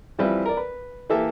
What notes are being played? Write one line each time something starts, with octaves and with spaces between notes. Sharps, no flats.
E3 F3 G3 C4 E4 B4
A#4 D5
B4
E3 A#3 G4 A4 E5